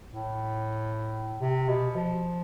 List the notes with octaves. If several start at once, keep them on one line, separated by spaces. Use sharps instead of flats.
A2
C3
B2
F3